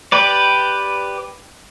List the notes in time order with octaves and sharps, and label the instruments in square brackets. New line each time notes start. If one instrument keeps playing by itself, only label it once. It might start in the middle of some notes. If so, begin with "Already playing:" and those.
[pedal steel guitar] G4 B4 D5